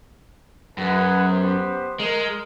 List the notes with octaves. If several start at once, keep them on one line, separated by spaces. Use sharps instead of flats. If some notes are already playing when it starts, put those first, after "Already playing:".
F#2 G#4 B4 F#5
B3 G4 C5
G#3 A#4